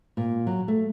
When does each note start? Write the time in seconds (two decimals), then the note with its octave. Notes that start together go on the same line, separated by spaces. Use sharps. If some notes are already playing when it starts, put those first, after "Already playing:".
0.17 A#2
0.47 F#3
0.68 A3